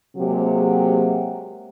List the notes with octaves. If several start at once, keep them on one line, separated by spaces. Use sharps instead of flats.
C3 F#3 G#3 A#3 G4